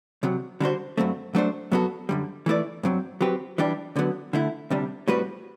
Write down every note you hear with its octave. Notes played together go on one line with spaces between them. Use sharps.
C2 C3 F#3
D3 G3 D4 F#4 C5
G2 F#3 A3 C4
F#3 A3 D4 A4 C5
F#2 F#3 B3 F#4 A4
F#2 D3 G3
E3 A3 E4 B4 D5
G2 F#3 C4
F#3 C4 G4 B4
E3 G3 D4 G4
D2 D3 F#3 B3
D3 A3 E4
D2 C3 G3 D4
A2 G3 C4 F#4 B4